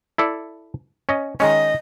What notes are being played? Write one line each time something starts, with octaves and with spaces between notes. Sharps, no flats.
E4 A4 D5
C#4 D#5
D#3 G#3 C#4 D#5